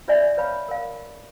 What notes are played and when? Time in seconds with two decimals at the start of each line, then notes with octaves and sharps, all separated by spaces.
0.08 F4 C#5 D5 E5 G#5
0.37 B4 C#5 F5 B5
0.68 A#4 F5